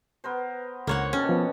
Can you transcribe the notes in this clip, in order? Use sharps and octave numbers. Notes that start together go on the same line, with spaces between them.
B3 A#4 C5
C#2 D3 A#3 C#5 F#5
B2 D#3 C#4 A4
F3 B3